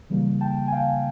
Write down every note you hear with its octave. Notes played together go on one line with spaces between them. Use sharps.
C#3 E3 G3 A#3
G5 A5
G#5
F5 G5